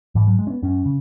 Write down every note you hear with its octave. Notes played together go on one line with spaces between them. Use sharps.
G#2 E3
F#3
G#3
C#4
B3
F#2 C#4
C#3